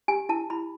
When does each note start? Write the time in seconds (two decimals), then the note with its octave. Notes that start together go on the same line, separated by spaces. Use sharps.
0.08 G4 G#5
0.29 E4 A5
0.50 E4 B5